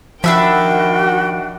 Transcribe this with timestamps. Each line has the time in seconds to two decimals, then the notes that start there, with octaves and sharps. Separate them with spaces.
0.24 D#3 F3 D4 F#4 E5 G5 B5